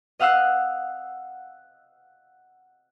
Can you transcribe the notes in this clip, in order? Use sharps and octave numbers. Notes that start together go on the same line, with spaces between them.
D#5 F5 F#5 E6 F#6 C7